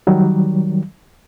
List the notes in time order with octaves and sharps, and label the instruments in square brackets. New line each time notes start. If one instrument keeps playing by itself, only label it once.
[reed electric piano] D#3 F#3 G3